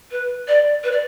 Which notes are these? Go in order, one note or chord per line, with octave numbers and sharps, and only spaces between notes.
B4
D5
B4
D5